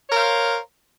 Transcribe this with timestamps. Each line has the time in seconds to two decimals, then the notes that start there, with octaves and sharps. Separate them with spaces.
0.09 C#5
0.11 A#4
0.14 C5
0.16 F5